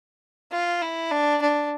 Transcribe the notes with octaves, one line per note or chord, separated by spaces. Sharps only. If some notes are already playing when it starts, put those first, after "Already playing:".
F4
E4
D4
D4